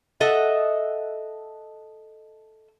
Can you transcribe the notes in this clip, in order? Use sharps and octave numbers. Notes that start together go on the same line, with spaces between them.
A4 D#5 E5 F#5